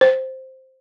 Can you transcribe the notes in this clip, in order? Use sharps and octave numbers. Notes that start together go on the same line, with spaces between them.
C5